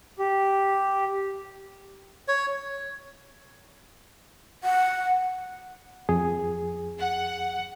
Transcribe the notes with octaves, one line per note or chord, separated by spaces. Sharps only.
G4
C#5
F#5
F2 G#4
F#5